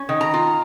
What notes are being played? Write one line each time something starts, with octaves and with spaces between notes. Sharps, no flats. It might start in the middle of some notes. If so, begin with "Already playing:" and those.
Already playing: C#4
D#3
A#5
F4